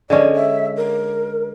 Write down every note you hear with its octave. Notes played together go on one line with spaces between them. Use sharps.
D3 G#3 C#4 D5
E5
A#4